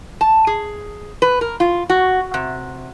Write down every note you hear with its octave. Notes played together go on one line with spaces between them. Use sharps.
A5
G#4
B4
A#4
F4
F#4
C3